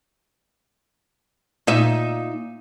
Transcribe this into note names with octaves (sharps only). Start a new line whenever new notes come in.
A#2 D#4 E5